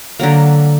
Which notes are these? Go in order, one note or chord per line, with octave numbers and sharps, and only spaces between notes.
D3 F#3 A#3